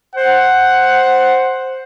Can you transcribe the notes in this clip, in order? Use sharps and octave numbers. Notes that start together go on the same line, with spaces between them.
C5 F#5